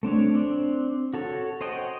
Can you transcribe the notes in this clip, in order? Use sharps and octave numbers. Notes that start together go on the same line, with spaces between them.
A3 C4 D4 C#5
C4 D4
F#4 A4 C#5
C5 C#5 D#5 F#5 G5